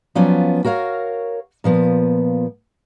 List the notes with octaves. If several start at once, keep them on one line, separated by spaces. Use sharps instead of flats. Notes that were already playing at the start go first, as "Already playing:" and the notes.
F3 F#3 B3 C#4 F4 D5
F#4 A#4 C#5 F5
A#2 F3 B3